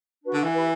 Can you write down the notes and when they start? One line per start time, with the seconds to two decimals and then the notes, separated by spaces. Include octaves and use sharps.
0.22 D4 F#4 B4
0.33 D3
0.43 E3
0.54 G4 B4 E5 B5